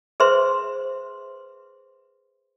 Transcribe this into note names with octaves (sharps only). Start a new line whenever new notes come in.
G#4 B4 C5 E5 C6